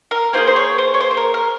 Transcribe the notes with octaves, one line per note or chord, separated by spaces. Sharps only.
A#4
A#3 F4 G#4 C5
C5
C#5
C5
C#5
C5
C5
A#4
A#4